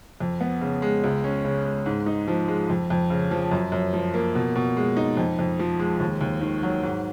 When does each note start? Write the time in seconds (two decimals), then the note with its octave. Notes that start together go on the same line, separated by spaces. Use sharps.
0.20 F2
0.41 B3
0.61 C#3
0.82 G#3
1.04 C#2
1.24 C#4
1.45 C#3
1.65 G#3
1.86 G#2
2.06 D#4
2.28 F3
2.48 G#3
2.70 F2
2.90 F2
3.10 C#3
3.31 F3
3.51 F#2
3.72 F#2
3.93 F3
4.14 A#3
4.35 B2
4.56 B2
4.77 G#3
4.97 D#4
5.17 F2
5.39 F2
5.59 F3
5.79 G#3
6.00 D#2
6.21 D#2
6.41 D#3
6.63 F#3
6.83 G#2